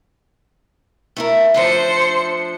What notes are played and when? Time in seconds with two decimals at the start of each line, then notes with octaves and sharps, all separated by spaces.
1.17 A3 E4 A#4
1.54 F3 A3 D4 C5 C#7